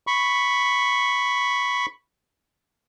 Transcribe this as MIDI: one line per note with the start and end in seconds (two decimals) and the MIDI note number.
0.07 1.86 83
0.07 1.86 85